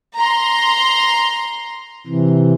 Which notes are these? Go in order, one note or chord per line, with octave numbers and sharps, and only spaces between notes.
A#5 C6
C3 E3